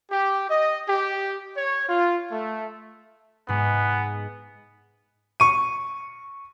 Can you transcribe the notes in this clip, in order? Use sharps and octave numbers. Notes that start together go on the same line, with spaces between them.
G4
D#5
G4
C#5
F4
A3
G#2 G#3 B3
C#6 D#7